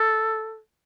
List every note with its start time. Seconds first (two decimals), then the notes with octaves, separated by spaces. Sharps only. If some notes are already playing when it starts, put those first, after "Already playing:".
Already playing: A4